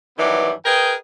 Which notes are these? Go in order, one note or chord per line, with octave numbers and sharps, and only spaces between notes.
G2 D#3 E3 F#3 B3 D5
G#4 A#4 B4 D#5 G5